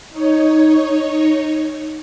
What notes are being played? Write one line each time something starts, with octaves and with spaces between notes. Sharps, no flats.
D#4 C#5